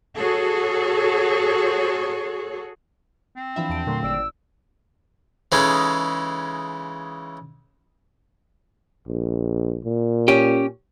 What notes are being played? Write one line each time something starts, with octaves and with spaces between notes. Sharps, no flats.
F#4 G#4 A4 C#5
C4
E3 F3 D4 E5 F5 B5
E2 G5 A5 D7
A#2 D3 F#3 A3 C6
G#1 D5 E6 D7
C#3 E3 G#3 C#4 D#4 A4
A#1
A#2
C#4 G4